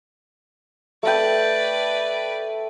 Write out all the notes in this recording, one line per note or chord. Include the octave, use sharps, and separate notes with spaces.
A3 B4 D5 G5